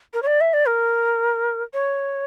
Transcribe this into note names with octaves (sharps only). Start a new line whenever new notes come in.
A#4
C#5
D5
E5
D5
A#4
C#5